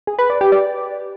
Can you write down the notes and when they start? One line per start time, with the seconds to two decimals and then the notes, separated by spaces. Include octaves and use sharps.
0.07 G#4
0.19 B4
0.30 D5
0.41 G4
0.52 D5